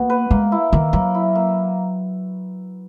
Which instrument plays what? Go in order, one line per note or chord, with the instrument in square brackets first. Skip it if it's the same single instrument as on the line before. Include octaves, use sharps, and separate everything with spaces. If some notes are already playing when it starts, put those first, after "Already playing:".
Already playing: [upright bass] A#3 [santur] B3 F#4
[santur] B4
[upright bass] G#3 [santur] A#3
[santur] E4
[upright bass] D#3 [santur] A#3
[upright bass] F#3 [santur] A#3
[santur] E4
A#3